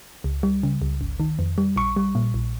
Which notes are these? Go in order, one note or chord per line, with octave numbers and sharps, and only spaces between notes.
C#2
G3
C#3
C#2
G1
D#3
F2
G3
A#1 C#6
G3
A#2
A#1